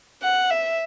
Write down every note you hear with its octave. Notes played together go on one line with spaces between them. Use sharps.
F#5
E5